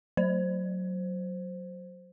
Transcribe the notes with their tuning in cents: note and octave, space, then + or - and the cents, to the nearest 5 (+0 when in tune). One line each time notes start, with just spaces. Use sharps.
F#3 +0 C5 +0